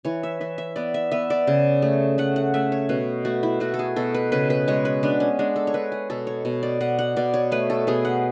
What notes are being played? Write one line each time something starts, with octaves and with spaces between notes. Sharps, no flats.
E3 C#5
E5
E3 E5
E5
B3 D5
E5
B3 E5
D5
C#3
A3
A3 F#5
F#5
A3 E5
C#5
B2 B4
A3 F#4
E4
A3 F#4
A4
G#4
B2 A4
B4
C#3 B4
B4
G#3 C#5
B4
B3 D4
C#4
G#3 D4
A4
C#5
G#3 B4
G#4
B2 A4
C#5
B2
D5
B2 F#5
F#5
B2 D5
C#5
A3 B4
A4
B2 G#4
F#5